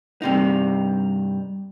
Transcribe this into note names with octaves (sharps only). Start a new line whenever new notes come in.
G2 C3 D#4